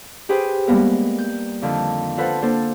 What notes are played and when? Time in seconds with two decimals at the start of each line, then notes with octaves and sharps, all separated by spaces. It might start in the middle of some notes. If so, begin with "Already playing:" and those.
0.29 G4 G#4 B4 C5 G5
0.67 G3 G#3 A#3 B3 A#4
1.19 G6
1.62 F2 D3 D#3 F3
2.18 F4 A4 B4 C5 F#5
2.42 A#3 D4 A4 C5